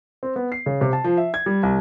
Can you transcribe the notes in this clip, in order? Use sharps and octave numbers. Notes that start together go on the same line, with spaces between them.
C4
B3
C7
C#3
C3
A5
F3
E5
G#6
G3
C2